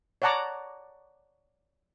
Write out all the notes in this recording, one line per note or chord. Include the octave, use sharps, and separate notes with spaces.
C#5 D5 F#5 A5 A#5 D6